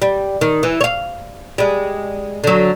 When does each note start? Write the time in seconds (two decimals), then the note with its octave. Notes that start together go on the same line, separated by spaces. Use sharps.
0.02 G3
0.41 D#3
0.63 E3
0.81 C#5 F5
1.58 G3 G#3
2.44 D3 F#3